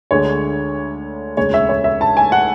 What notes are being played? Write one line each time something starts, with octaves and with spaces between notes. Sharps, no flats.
D2 D3 G#3 C#5
E1 D2 C#3 C#5
E5
C#5
E5
A5
G#5
F#5